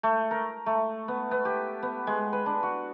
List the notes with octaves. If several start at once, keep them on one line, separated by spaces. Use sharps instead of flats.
A3
A#4
A3
B3
B3
G4
B3
G#3
B4
D4
F#4